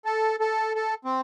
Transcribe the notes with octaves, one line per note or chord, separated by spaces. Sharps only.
A4
A4
A4
C4